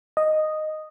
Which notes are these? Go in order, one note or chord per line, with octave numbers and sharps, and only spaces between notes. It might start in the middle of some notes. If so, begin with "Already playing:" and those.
D#5